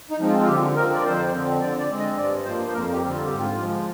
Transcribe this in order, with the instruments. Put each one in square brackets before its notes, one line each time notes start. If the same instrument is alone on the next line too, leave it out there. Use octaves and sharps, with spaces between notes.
[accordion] D#4
F3 G#3 C4
F4
F4
D3 G4
F3 C4 A#4
D5
F2 C5
D3 F3 C4
D3 D5
D5
G#3 C4
D#5
G2 D5
F3 A#3 C5
C5
F2 A#4
G4
D3 G3 C4
F4
G#2 G4
F4
F3 G#3